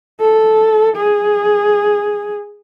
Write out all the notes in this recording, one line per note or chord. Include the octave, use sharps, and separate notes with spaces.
A4
G#4